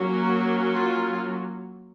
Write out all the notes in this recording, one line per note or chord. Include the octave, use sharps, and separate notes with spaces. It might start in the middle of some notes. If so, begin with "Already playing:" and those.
Already playing: F#3 A#3 C#4
F#4
F4